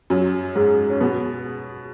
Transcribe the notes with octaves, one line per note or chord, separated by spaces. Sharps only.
F#2 F#3
G#2 G#3
C#4
B2 B3